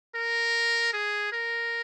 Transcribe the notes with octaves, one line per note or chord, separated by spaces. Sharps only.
A#4
G#4
A#4